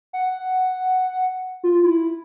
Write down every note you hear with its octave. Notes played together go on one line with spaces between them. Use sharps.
F#5
F4
E4